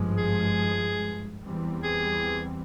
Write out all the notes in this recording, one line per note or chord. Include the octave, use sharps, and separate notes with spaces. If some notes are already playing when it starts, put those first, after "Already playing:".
Already playing: G#1 G2 F3 G#3
G#4
E2 E3 G3 C4
G#4